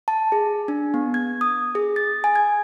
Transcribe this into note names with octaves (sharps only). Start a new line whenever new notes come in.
A5
G#4
D4
B3
G#6
D#6
G#4
A6
G#5
G#6